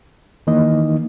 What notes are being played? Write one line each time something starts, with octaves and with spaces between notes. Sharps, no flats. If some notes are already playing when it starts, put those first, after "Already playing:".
D#3 E3 A#3 D#4 D#5